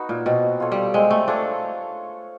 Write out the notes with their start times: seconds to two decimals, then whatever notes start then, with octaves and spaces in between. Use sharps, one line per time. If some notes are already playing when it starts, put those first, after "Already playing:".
Already playing: B3 D#4 F#4
0.09 A#2
0.25 B2 C4
0.60 F4 A4 C#5
0.72 G3
0.94 G#3 C4
1.10 A3
1.28 D4 F4 A4 C#5